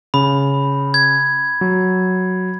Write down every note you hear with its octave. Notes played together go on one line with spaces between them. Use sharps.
C#3 B5
G#6
F#3